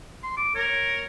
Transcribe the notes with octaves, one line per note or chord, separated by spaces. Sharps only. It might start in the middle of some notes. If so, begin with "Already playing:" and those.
C6
D6
A#4 C#5
C#5